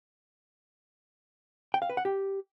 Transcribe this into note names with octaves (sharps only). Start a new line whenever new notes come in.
G5
F5
B4
F#5
G4